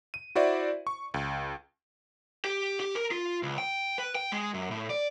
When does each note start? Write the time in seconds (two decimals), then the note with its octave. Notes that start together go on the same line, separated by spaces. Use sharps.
0.14 D#7
0.35 E4 F#4 C5 D5 E5
0.87 C#6
1.14 C#2
2.45 G4
2.80 G4
2.95 A#4
3.11 F4
3.43 C#2
3.58 G5
3.98 B4
4.15 G5
4.32 G#3
4.54 F#2
4.71 A2
4.90 D5